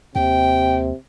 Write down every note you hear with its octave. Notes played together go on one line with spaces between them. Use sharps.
D#2 C3 G5